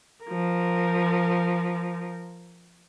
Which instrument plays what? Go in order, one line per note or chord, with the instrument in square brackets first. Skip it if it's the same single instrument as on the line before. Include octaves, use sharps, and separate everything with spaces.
[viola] F3 A#4